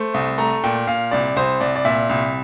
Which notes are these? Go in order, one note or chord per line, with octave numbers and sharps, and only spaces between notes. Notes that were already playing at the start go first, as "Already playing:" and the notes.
Already playing: A3 C5
C2
A3 A#5
A#2 G5
A#2 F5
C2 D5
C2 C5
C2 D5
D5
A#2 E5
C2